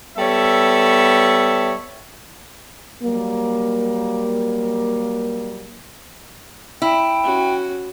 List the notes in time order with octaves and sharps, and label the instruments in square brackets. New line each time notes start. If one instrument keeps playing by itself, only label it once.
[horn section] G3 B3 A4 C#5 E5
[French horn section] F#3 G3 A#3
[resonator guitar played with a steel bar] E4 [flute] G5
[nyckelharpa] C#4 F#4